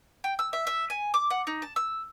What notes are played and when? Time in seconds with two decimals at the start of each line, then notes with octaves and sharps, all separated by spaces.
0.24 G5
0.39 E6
0.53 E5
0.67 E5
0.90 G#5
1.14 D6
1.30 F#5
1.47 D#4
1.62 A5
1.76 E6